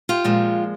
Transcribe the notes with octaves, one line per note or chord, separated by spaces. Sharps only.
F4 G4
A#2 F3 G#3